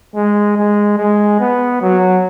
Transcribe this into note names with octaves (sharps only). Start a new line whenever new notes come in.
G#3
G#3
G#3
B3
F#3